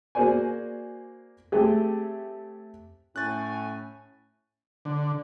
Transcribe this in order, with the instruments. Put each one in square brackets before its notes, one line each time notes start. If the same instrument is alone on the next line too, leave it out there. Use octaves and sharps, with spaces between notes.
[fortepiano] A#3 F#4 G#4 C5 D5 G#5
A3 C4 G4 G#4
[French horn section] A2 [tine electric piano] C#4 C#6 G6 [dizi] G#5 [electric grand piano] F#6 A6
[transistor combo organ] D3